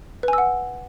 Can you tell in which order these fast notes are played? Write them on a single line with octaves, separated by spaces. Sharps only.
B4 G#5 E6 F#5